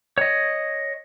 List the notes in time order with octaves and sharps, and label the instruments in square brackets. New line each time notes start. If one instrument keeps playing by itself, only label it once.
[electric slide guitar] C#5 D#5